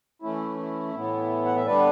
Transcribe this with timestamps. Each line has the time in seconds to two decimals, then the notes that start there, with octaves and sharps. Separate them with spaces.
0.22 E3 A3 C#4 E4
0.58 E4
0.94 A2 E3 B3
1.46 F#5
1.56 E5
1.66 D3 G3 B3 D4 B4 D5